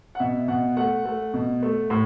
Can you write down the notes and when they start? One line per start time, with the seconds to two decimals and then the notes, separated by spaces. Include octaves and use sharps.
0.15 F#5
0.20 B2 E5
0.48 B2 F#5
0.77 A3 F#5
1.05 A3
1.34 B2
1.63 A3
1.90 A2